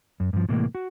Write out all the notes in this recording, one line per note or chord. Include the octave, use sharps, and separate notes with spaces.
F#2
G2 F3
A2 C3 E3 G#3 A#3
F#4